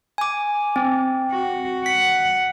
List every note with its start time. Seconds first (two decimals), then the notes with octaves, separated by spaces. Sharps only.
0.18 G#5 D6
0.76 C4
1.31 F#4
1.86 F#5 B6